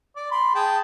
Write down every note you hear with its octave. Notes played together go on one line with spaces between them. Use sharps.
D5
B5 C6
G#4 G5 A5